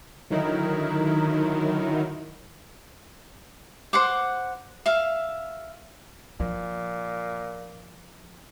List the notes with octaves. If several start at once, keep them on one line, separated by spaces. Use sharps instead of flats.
D3 D#3 F#3 D#4 E4 A#4
C5 F#5 D6
E5 F5
A#2 F3